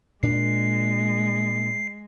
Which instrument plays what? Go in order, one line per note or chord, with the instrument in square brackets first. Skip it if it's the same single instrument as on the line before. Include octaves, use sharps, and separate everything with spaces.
[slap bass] A#2 D4 [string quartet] G#3 [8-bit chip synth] C7